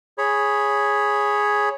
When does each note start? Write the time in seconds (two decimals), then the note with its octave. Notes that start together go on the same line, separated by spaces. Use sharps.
0.18 G#4 C#5 B5